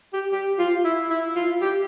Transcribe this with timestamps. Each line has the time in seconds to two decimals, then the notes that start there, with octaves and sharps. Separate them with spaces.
0.13 G4
0.32 G4
0.59 F4
0.84 E4
1.10 E4
1.36 F4
1.61 G4